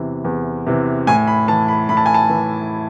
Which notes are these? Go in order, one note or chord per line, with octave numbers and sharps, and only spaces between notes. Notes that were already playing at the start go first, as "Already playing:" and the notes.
Already playing: E2 C3 E3
E2
C3 E3
A2 G#5
B5
E3 A5
B5
A2 B5
A5
G#5
A5
E3